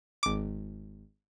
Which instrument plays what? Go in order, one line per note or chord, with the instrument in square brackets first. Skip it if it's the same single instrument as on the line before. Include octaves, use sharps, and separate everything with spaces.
[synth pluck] G#1 D6